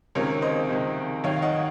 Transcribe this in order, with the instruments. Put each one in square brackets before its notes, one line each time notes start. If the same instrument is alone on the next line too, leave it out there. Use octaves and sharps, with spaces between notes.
[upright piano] C#2 C3 D#3 A#4 C#5
C5 D#5
C#2 C3 D#3
D#2 D#3 C#5 F5
F5
D#5 F#5